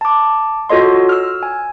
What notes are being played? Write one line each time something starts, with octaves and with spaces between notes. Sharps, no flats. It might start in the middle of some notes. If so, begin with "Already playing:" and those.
A5 D6
F4 F#4 A4 C#5 D#5 C6
E6 F6
G#5